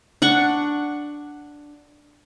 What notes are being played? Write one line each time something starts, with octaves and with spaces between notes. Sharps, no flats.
D4 F#5 C#6